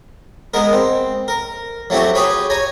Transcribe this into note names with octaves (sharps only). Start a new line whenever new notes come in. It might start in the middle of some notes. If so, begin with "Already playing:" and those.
G#3 B3 A#4
C4
A#4
F#3 A3 C4 F#4 G4
G4 G#4 B4 C#5 B5
C#5 G#5 A#5